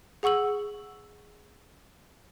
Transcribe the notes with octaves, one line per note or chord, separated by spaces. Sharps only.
G#4 F#5 C#6 E6 F#7